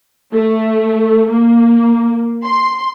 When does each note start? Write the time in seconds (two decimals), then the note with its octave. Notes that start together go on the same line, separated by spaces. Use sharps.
0.33 A3
1.31 A#3
2.45 C6